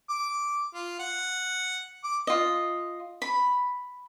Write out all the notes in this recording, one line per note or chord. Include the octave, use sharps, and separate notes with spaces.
D6
F4
F#5
D6
F4 D#5
B5